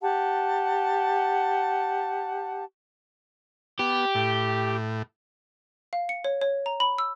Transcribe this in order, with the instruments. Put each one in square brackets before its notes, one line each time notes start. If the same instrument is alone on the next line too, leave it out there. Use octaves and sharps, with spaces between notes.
[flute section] G4 F#5 A5
[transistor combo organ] B3 [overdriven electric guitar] G4
[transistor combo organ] A2
[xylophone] F5
C#7
C#5
C#5
A#5
B5
E6